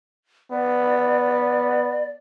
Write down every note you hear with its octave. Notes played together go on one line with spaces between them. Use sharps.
B3 D5